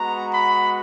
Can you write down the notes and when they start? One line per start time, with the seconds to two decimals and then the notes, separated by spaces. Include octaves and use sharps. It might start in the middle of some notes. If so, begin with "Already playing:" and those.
Already playing: G#3 B3 F#4 A#5
0.32 B5